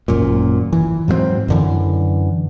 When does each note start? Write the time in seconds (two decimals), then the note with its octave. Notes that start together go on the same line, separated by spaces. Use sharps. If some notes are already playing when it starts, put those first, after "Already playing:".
0.08 G#1 F#2 A#2
0.73 E3
1.08 G#2 F#3 A#3 C4
1.48 F#2 D3 E3